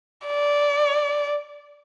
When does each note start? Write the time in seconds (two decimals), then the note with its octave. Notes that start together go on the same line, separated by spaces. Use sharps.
0.27 D5